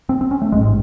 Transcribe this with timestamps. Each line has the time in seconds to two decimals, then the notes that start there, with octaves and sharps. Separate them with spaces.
0.09 C4
0.21 C4
0.31 C#4
0.42 A3
0.52 A1 G#2 G#3